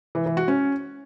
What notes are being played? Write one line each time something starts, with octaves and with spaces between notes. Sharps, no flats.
E3
E3
F#4
C#4